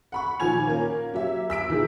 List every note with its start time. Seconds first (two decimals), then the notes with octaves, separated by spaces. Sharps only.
0.12 F#5 B5 C#6
0.40 A#2 D#3 F3 G#5 G#6 F7
0.67 A#3 C#4 A#4
1.14 F#3 G4 E5
1.50 E6 B6 D7
1.69 A#2 D#3 E3 G#4